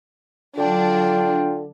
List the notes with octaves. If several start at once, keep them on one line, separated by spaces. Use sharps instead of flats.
D3 F#3 D4 F4 G5